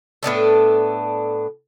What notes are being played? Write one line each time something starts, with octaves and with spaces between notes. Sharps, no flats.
A2 B3 D4 A4